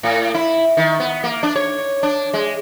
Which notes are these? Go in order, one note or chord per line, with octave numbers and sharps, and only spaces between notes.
A2
E4
D#3
B3
A#3
D4
C#5
D4
G#3